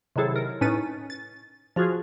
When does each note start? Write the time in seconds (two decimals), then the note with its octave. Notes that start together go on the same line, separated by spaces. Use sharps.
0.16 C3 D#3 F#3 E4 G#4 A4
0.36 A#4
0.61 A2 C#4 D#4 B4 A6 D#7
1.10 A6
1.76 F3 F4 F#4 G#4